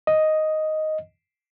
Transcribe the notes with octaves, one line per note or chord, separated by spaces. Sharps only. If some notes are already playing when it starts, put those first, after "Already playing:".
D#5